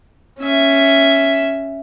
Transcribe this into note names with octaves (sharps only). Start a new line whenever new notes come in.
C#4 E5